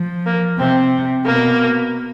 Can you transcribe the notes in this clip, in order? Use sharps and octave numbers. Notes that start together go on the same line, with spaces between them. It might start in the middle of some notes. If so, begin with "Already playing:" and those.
Already playing: F3
A#3
C3 C4
B2 A#3